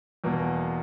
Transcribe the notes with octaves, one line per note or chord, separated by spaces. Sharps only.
E2 B2 A#3